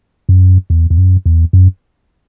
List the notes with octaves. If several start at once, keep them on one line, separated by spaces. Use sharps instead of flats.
F#2
E2
E2
F#2
E2
F#2